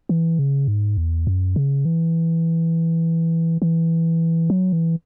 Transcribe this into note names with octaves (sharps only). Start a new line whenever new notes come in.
E3
C#3
G#2
E2
F#2
C#3
E3
E3
F#3
E3